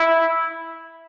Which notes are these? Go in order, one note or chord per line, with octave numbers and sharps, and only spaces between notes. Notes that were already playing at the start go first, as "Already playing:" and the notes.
Already playing: E4